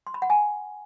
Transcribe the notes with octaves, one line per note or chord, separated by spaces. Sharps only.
C6
B5
F#5
G#5